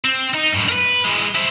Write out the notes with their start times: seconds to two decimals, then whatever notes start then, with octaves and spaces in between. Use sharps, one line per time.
0.04 C4
0.35 D#4
0.54 F#2 A2
0.69 A#4 B4
1.05 E3 G#3
1.35 E4 C5